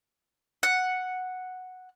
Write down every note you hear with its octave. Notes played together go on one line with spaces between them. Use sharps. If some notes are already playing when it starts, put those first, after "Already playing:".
F#5